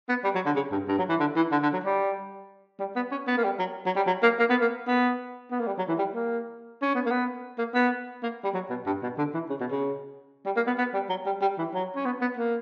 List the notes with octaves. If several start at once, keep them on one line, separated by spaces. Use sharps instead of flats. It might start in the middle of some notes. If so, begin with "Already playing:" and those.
B3
G3
F#3
D3
C#3
G2
G2
F#3
E3
D3
E3
D3
D3
F#3
G3
G3
B3
C#4
B3
A#3
G3
F#3
F#3
G3
F#3
A#3
A#3
B3
A#3
B3
B3
A#3
G3
F#3
E3
G3
A#3
C#4
B3
A#3
B3
A#3
B3
A#3
G3
F#3
B2
G2
B2
D3
E3
C#3
B2
C#3
G3
A#3
B3
B3
G3
F#3
G3
G3
E3
F#3
C#4
B3
B3
A#3